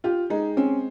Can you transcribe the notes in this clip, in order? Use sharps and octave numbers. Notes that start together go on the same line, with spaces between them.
F4 G4
G#3 D#4
C4 C#4